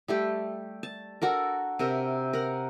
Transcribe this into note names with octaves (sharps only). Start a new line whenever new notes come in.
G3 A3 G4
A5
D4 F#4 A4 A#4
C3 A#4 E5
A#4 F#5